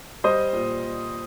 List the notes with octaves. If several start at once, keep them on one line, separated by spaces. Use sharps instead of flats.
G3 C5 D#5
A#2